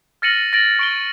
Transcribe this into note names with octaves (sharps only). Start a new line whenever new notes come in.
F6 A6 A#6 C#7 D#7 F#7
A6 A#6 D7 F#7
C#6 D7 G7